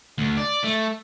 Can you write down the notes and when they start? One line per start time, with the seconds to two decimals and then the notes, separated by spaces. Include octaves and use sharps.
0.18 D2
0.37 D5
0.64 A3